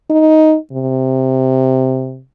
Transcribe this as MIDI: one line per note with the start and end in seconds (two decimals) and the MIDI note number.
0.10 0.56 63
0.72 2.21 48